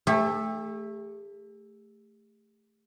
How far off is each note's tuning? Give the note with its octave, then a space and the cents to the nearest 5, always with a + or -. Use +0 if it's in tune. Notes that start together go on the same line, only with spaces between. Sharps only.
A3 +0 G4 +45